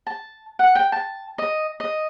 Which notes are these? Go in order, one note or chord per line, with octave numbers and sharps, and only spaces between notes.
A5
F#5
G5
A5
D#5
D#5